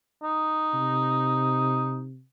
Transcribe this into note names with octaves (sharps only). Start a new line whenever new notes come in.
D#4
C3